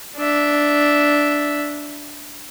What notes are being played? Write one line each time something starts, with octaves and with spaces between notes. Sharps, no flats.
D4 E5